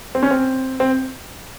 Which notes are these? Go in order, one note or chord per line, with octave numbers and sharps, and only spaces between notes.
C4
C#4
C4
C4